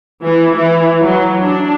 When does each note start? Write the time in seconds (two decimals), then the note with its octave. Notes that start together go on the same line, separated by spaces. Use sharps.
0.23 E3
0.57 E3
1.04 F#3
1.44 D4